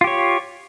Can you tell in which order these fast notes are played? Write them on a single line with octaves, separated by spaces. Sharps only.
F4 G4 C#5